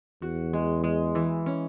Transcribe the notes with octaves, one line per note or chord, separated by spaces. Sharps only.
E2 F#4
G#3
G#3
E3
C#4